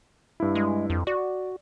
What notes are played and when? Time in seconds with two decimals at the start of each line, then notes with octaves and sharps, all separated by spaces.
0.40 G2 E4
0.55 G#3
0.90 F2
1.07 F#4 D5